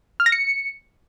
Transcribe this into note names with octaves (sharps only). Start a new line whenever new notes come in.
F6
A#6
C#7